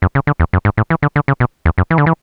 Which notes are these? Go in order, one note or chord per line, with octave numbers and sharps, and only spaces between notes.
F#2
C#3
D3
E2
F#2
G#2
A2
E3
D3
D3
C#3
B2
E2
F#2
E3
D3
E3